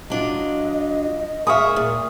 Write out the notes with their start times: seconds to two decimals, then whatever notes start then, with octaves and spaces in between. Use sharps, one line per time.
0.10 F#3 D4 F4 D#5
1.47 G#4 A#4 E5 F5 C#6 D#6
1.76 A#2